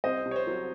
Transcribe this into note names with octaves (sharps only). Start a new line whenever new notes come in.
C2 C5 D#5
C3
C#5
C5
F#3